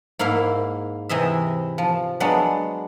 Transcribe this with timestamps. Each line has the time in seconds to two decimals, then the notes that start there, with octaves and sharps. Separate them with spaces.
0.19 G#2 A#3 E4 F5
1.09 C3 E3 E4 D#5 E5
1.78 F3
2.20 F#3 G#3 B3 D4